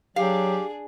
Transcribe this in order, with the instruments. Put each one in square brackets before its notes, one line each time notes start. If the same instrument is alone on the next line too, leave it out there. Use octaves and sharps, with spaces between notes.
[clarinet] F#3 [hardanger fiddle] D4 G#4 [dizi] G4 [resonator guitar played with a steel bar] F5